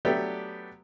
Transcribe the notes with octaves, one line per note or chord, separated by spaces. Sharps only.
F#3 A3 B3 D4 G4